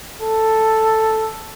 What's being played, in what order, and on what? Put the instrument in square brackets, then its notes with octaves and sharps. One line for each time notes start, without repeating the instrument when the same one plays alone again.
[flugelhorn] A4